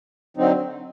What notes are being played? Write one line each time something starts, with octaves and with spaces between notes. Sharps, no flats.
D3 F#3 C4 D#4